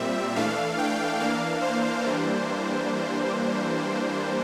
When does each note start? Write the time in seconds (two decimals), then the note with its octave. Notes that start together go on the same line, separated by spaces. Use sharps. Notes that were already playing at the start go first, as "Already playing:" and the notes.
Already playing: A#2 G3 C4 E5
0.36 E3 A3 D4 F5
0.78 G5
1.20 E3 A#3 D4 F5
1.62 C5
2.04 E3 G3 A#3 D4